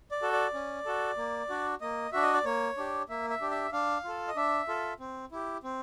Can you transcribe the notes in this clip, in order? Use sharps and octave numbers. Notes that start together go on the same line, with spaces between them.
D5
F#4 A4
D5
C#4
F#4 A4
A#3
D4 F#4
A#3 D#5
D4 F#4 E5
D#5
D5
A#3 C#5
D4 G4
A#3 E5
E5
D4 G4
E5
D4 F5
F4 A4
D#5
D4 E5
F4 A4
C4
E4 G4
C4